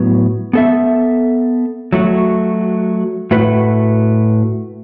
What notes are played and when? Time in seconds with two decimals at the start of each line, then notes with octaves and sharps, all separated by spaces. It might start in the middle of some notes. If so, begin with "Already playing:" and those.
Already playing: A2 F#3 B3
0.53 B3 A4 E5
1.93 F#3 A3 F#4
3.31 A2 A3 F#4 B4